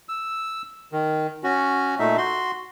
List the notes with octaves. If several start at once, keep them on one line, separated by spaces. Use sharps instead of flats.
E6
D#3
C#4 F#4
A#2 A3 D#4 E5
F#4 C6